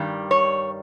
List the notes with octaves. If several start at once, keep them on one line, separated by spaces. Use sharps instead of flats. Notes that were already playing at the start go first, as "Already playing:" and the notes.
Already playing: G2 D#3 G3
C#5